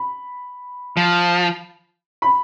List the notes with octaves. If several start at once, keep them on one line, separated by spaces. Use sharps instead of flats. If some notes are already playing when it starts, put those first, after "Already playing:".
Already playing: B5
F3
B5